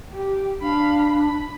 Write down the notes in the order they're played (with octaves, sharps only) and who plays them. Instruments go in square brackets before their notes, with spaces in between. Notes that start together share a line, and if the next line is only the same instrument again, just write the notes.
[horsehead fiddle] G4
[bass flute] D4 [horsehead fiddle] F5 B5
[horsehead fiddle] B5